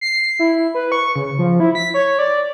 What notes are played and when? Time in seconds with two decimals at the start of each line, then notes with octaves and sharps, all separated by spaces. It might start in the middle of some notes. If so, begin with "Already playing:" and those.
0.01 C7
0.39 E4
0.75 B4
0.92 C#6
1.16 C#3
1.39 F3
1.60 E4
1.75 B6
1.94 C#5
2.19 D5